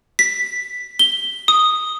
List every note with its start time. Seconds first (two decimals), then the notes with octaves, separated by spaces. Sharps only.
0.19 B6
0.99 G7
1.48 D#6